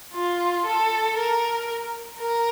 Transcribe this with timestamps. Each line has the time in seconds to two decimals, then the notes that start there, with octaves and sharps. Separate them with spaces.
0.14 F4
0.66 A4
1.17 A#4
2.20 A#4